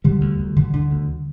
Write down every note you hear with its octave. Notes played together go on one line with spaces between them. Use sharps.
D3 G3
D2
D2
D3
D3
D2